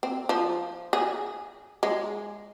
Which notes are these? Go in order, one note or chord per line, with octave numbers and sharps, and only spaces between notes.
C4
F3
G#4
G#3